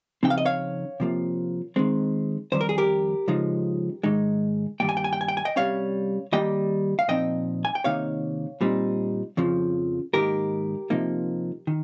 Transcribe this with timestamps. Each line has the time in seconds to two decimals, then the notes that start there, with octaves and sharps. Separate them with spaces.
0.23 C#3 F3 C4 D#4 G5
0.30 F5
0.38 D#5
0.45 C#5 F5
1.00 C3 F3 A#3
1.76 D#3 G#3 C4
2.52 F2 D#3 G3 C5
2.61 A#4
2.69 G#4
2.78 G4 A#4
3.28 C#3 F3 G#3 D#4
4.03 G#2 D#3 G#3 D#4
4.80 G2 D#3 G3 A#3 G5
4.89 G#5
4.97 G5
5.04 G#5
5.13 G5
5.21 G#5
5.28 G5
5.37 G#5
5.45 D#5 G5
5.56 C3 G3 C#4 C#5 F5
6.32 D#3 G3 A#3 D#5 G5
6.99 F5
7.08 A#2 F3 C4 D#4 D#5 G5
7.65 G#5
7.75 G5
7.84 C3 D#3 A#3 D#4 C#5 F5
8.61 A#2 G3 C4 D#4
9.37 F2 C#3 F3
10.14 G#2 D#3 A#3 D#4 G4 A#4
10.90 C3 F3 A#3 D#4
11.67 D#3